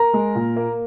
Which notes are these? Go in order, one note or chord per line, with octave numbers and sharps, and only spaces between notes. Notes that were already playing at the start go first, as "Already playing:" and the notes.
Already playing: A#4 A#5
G#3
A#2
A#3